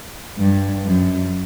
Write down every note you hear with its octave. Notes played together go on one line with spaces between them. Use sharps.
G2
F#2